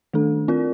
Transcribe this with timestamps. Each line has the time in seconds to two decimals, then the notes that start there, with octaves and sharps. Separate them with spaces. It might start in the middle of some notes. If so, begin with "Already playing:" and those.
0.13 D#3 A3 D4 A4
0.48 C4 F4 A#4 D5